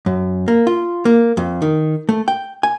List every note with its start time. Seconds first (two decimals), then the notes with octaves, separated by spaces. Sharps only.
0.06 F#2
0.48 A#3
0.67 F4
1.05 A#3
1.37 F2
1.62 D#3
2.09 A3
2.28 G5
2.63 G#5